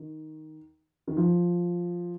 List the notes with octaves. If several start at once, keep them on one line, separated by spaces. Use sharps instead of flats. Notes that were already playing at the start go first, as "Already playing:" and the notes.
Already playing: D#3
D#3
F3